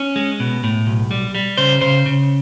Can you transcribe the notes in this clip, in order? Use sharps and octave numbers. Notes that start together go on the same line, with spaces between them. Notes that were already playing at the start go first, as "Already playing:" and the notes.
Already playing: C#4
G#3
B2
A2
B1
G3
G3
C#3 C5
C#3 C5
C#3